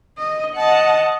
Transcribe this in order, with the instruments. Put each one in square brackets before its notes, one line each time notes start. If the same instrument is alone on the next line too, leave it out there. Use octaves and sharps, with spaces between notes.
[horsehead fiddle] D#5
[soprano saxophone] D#5 [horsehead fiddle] F#5 A5